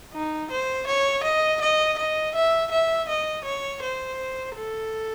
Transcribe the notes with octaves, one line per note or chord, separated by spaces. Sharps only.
D#4
C5
C#5
D#5
D#5
D#5
E5
E5
D#5
C#5
C5
A4